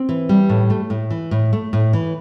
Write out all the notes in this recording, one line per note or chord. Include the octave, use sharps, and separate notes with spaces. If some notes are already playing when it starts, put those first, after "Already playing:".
Already playing: C4
E3
G3
A2
A3
A2
E3
A2
A3
A2
E3